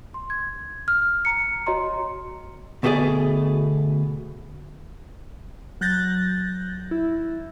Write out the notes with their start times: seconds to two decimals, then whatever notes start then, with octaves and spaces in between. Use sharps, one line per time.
0.14 C6
0.30 G#6
0.88 F6
1.25 A#5 C#7
1.66 F#4 C#5 D#5 A#5 C6
2.83 D2 B2 A3 G4 G#4 D5
5.81 F#3 F#6 G6 A6 A#6
6.91 E4